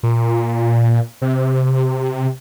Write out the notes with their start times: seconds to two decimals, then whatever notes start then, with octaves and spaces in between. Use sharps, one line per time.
0.03 A#2
1.22 C3